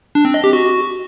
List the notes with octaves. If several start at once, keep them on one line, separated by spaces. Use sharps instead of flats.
D4
C4
D#5
G4
F#4